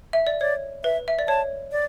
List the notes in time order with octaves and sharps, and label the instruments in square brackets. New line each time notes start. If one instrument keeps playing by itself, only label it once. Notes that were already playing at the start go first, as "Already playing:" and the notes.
[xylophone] E5
D5
[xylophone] C#5 [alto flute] D5
[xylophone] B4 [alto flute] E5
[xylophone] E5
D5
[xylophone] C#5 [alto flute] A5
[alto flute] D5